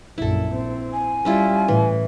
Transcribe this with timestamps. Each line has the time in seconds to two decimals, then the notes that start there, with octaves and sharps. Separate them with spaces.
0.18 A#1 F#2 E4 A4
0.54 C4
0.93 G#5
1.25 G3 C#4 E4 F4
1.68 A2 E3